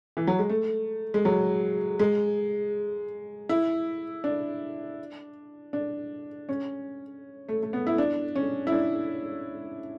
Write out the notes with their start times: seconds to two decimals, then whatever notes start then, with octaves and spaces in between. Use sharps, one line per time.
0.17 E3
0.27 F#3
0.39 G#3
0.50 A3
1.14 G#3
1.25 F#3
1.99 G#3
3.49 E4
4.24 D4
5.73 D4
6.49 C#4
7.49 A3
7.63 A3
7.73 B3
7.87 E4
7.98 D4
8.36 C#4
8.67 E4
8.72 D4